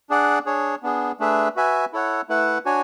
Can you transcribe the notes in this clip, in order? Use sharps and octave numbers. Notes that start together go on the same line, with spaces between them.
D4 G#4 D5 F#5
D4 G#4 C#5
B3 D4 G#4
A3 D4 G#4 B4 E5
F#4 B4 E5 G#5
E4 A4 C#5 F#5
A3 E4 B4 F#5
D4 F#4 C#5 G#5